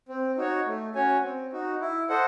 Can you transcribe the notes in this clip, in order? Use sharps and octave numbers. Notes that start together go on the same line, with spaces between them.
C4
D#4 F#4 C#5
A3
C#4 F#4 C#5 G#5
C4
D#4 F#4
E4
A4 C5 D#5 F#5